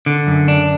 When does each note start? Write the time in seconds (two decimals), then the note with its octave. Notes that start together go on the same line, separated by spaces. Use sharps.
0.06 D3
0.27 F#2
0.48 D4